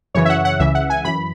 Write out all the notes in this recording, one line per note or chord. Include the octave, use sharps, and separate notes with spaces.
F#2 C#3 E3 C#5
E5
F#5
F#5
C#2 C#3 E3 E5
F#5
G#5
F#2 E3 B5